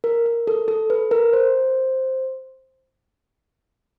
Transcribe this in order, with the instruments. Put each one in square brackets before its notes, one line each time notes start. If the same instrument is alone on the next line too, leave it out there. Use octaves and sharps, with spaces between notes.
[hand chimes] A#4
A#4
A4
A4
B4
A#4
C5